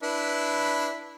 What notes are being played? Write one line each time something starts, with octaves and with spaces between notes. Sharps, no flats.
D4 E4 B4